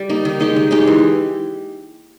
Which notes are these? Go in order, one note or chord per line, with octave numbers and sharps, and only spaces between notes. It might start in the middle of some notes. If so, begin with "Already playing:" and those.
Already playing: G3
A#3 D#4
D#3
G#3 D#4 G4
D#3
G#3 D#4 G4
E3